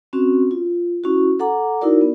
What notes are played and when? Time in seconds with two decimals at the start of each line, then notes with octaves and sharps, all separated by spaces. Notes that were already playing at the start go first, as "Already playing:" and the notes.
0.13 C4 C#4 F#4
0.51 F4
1.04 C#4 E4 F#4
1.39 A4 F#5 A#5 D6
1.82 D#4 E4 F#4 A#4 D5
2.01 B3